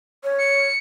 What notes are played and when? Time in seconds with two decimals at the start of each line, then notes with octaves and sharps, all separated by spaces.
0.24 C#5
0.38 C#7